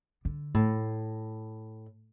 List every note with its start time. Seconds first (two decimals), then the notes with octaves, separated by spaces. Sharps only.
0.25 D3
0.54 A2